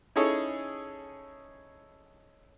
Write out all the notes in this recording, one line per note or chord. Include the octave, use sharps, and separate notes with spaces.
C#4 D#4 E4 G#4 A4 C#5